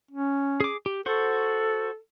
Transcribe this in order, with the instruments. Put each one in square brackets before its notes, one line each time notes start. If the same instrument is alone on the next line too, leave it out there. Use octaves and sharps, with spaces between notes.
[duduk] C#4
[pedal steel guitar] G#4 D6
G4
[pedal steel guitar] F#4 C5 C#6 [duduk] A4